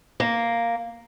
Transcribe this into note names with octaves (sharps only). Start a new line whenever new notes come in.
A#3